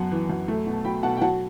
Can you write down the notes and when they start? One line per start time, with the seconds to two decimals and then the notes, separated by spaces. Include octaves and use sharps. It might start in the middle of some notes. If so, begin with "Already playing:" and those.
Already playing: F#2 B3 F#5 A5
0.12 E3
0.30 F#2
0.48 A3
0.67 B2
0.73 A5
0.85 F#3 G5 B5
1.03 B2 F#5 A5
1.17 G5
1.21 F#3 F#5 A5